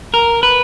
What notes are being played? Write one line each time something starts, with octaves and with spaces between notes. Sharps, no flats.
A#4
B4